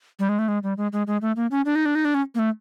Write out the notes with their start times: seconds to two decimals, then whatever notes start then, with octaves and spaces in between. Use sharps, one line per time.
0.19 G3
0.29 G#3
0.39 A3
0.48 G#3
0.63 G3
0.77 G#3
0.93 G#3
1.07 G#3
1.22 A3
1.36 A#3
1.51 C#4
1.65 D4
1.75 D#4
1.86 D4
1.95 D#4
2.05 D4
2.15 C#4
2.35 A#3
2.39 A3